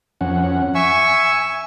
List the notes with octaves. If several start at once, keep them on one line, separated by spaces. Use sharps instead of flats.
F2 C#4 F#5
E5 G#5 C#6 E6